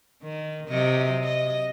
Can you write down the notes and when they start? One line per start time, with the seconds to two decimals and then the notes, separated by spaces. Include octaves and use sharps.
0.23 D#3
0.68 C3 F#3 D#5
1.23 D#5